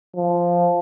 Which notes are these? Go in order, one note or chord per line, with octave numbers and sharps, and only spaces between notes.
F3